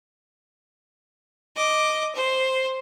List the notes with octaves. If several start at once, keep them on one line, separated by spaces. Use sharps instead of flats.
D#5 D6
C5